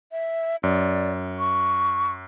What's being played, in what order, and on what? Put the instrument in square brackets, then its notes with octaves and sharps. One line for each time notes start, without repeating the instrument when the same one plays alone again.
[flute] E5
[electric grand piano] F#2 [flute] D5
[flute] C#6